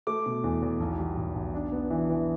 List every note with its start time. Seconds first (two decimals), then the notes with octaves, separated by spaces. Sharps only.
0.07 A3 D6
0.26 B2
0.44 E2
0.62 E2
0.80 B1
0.99 G3
1.17 B1
1.35 B1
1.54 D4
1.72 B3
1.90 E3
2.10 E3